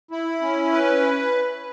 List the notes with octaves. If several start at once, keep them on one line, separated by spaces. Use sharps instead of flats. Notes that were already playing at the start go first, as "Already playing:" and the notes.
E4
C#4
B4